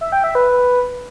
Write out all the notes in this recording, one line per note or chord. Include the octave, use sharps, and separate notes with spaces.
E5
G5
E5
B4